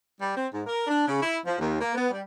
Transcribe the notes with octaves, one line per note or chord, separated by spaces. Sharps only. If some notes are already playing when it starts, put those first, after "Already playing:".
G3
C4
G#2
A#4
D4
C#3
E4
F3
D#2
A#3
B3
G3